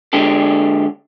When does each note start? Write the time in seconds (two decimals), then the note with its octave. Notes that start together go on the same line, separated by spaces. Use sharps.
0.13 D3 G#3 D4 G4 A4